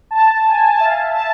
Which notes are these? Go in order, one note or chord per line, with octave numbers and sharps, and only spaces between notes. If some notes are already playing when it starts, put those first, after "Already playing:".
A5
G#5
G#5
A5
E5
F5
E5
A5